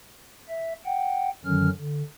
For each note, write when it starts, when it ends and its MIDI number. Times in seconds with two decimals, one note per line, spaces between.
0.48 0.73 76
0.85 1.30 78
0.85 1.30 79
1.45 1.70 42
1.45 1.70 50
1.45 1.70 51
1.45 1.70 54
1.45 1.70 61
1.45 1.70 89
1.78 2.03 50